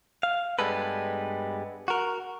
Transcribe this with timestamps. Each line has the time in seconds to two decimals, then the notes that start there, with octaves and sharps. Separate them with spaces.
0.23 F5
0.59 G2 G3 G#3 B3 A4 B4
1.88 F#4 A#4